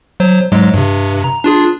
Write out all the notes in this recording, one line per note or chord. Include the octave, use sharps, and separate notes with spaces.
F#3 C5
G#2 F#3 G#3
G2 C3
A#5
D4 F4 G#4